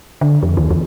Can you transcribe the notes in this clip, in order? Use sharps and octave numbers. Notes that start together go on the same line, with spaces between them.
D3
F2
D#2
E2